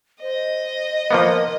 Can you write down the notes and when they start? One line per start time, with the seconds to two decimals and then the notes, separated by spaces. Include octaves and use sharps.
0.22 C5 D#5
1.11 F3 A#3 B3 A#4